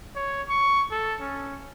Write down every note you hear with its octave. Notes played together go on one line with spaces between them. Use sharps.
C#5
C#6
A4
C#4